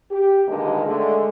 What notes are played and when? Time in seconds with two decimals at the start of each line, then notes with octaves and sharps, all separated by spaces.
0.11 G4
0.48 G2 A#2 D3 D#3 G3 G#3
0.86 D3 G#3 A3